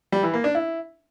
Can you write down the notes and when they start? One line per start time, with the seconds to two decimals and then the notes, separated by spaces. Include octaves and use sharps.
0.12 G3
0.23 E3
0.34 A#3
0.44 D4
0.55 E4